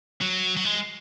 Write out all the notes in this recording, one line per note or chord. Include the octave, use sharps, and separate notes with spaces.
F#3
F#3
G#3